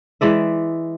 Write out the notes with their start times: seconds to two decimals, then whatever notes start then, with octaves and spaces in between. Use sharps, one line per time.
0.21 E3 G#3 D5 E5